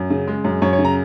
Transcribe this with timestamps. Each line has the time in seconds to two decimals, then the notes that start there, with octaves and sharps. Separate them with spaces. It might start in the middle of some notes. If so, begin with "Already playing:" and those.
Already playing: F#2
0.10 C#3
0.28 G#3
0.45 F#2
0.62 F#2 C#5
0.73 C#5
0.79 C#3
0.85 A#5